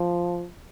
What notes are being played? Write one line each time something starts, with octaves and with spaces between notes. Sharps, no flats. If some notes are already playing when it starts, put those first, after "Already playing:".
Already playing: F3